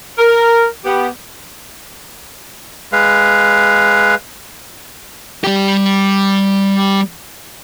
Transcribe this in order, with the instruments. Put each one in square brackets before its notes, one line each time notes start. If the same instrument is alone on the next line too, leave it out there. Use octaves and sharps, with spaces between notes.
[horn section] A#4
B3 G4
[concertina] G#3 B4 F5
[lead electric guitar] G3 G4